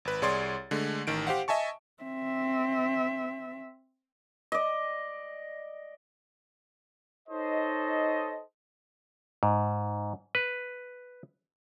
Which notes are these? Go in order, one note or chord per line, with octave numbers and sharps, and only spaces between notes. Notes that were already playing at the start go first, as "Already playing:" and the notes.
G#1 B4
C2 G#4 C#5 D5 C6 A6
D3 G#3 A3
A1 D#3 D7
G4 C5 F5 F#5
D#5 E5 G#5 A5 C#6
C4 E5
D5 D#5
D#4 A4 C5 C#5 D#5
G#2
B4